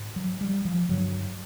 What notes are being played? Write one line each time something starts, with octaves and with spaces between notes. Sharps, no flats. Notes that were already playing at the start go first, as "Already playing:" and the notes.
Already playing: G#2
F#3
G3
F3
G2 D3 F#3